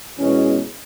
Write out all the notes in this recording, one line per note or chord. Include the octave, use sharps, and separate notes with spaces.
E2 B2 G#3 C#4